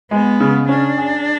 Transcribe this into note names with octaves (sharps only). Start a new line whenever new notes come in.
G#3 B3
C#3
C#4 D4
G#4